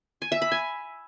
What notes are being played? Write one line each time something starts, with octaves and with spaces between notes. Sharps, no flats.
G#5
E5
B5
G#5